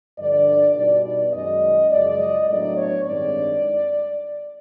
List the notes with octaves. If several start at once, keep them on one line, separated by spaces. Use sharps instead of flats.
G2 D3 F3 D5
B2 G3 B3 D#4 D5
D5
F#2 D#3 G#3 C#4 D#5
F#2 C#3 F3 G#3 D5
D#5
A2 F#3 B3 D4 D5
C#5
G2 D#3 G#3 C4 D#4 D5